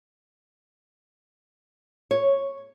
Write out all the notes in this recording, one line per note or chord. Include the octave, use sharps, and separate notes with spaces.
C#5